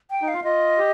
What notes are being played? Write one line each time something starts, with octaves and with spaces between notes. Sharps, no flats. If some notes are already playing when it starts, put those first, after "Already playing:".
G5
D#4
F5
F4
F4 D#5
G4